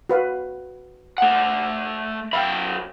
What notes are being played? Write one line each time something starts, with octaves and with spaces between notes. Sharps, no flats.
F#4 B4 F5
A3 F#5
F#2 E5 F5 G5 B5